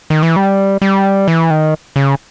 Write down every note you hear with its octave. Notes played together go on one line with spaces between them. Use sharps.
D#3
E3
G3
G3
E3
D#3
C#3